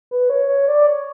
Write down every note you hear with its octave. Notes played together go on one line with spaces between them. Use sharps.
B4
C#5
C#5
D5
C#5